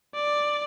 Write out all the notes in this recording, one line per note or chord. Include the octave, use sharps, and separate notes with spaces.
D5